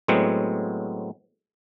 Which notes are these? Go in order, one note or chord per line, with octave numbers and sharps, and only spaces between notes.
A2 F#3 G#3 B3 C4